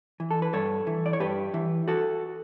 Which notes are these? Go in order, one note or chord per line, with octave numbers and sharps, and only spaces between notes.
E3
A4
B4
G2 A4 C#5
E3
D5
C#5
G2 G4 B4
E3
F#4 A4